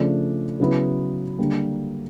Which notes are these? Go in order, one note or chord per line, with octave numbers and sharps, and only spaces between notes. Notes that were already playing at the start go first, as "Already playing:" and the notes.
Already playing: C#3 F3 A3 D4
C#3 F#3 B3 E4
D3 G3 A#3